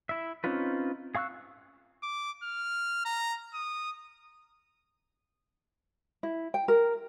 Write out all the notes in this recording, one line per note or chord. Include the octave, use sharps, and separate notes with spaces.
E4 E5
C4 C#4 D#4 F4 B4
G#4 F5 C#6 E6 F#6
D6
F6
A#5
D#6
E4
G5
A#4